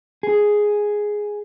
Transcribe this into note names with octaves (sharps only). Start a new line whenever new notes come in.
G#4